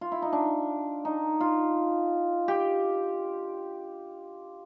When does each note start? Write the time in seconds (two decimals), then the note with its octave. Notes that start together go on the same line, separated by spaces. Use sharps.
0.01 F4
0.12 E4
0.22 D#4
0.33 D4
1.05 D#4
1.40 F4
2.48 G4